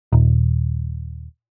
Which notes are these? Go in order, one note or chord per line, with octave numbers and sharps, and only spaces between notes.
D#1